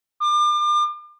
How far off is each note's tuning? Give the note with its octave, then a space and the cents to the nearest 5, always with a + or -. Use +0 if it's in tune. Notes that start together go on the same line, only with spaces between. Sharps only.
D6 +35